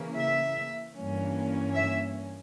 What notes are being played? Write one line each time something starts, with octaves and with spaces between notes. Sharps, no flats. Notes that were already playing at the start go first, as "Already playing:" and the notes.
Already playing: C#3 E3 A#3
E5
G2 E3 A#3 C#4
E5